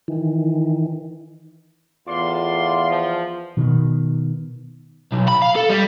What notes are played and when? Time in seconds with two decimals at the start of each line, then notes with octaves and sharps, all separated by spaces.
0.08 D#3 E3
2.08 E2 A2 F4 D5 C6
2.89 F3
3.57 B2 D#3
5.13 B1
5.28 B5
5.42 F5
5.56 A4
5.70 G3